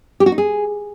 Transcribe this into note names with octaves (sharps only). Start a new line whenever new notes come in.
G4
F#4
D#4
G#4